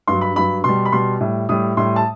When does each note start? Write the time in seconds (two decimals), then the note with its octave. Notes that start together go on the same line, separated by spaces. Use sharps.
0.07 G2 F#3 C6
0.21 B5
0.36 G2 F#3 B5
0.64 B2 G3 C6
0.85 B5
0.92 B2 G3 C6
1.20 A2 G3
1.49 A2 G3 D#6
1.77 A2 G3 C6
1.96 A5